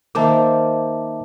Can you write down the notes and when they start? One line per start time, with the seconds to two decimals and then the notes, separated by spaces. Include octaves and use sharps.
0.15 D#3 A#3 C5 E5 A5 D6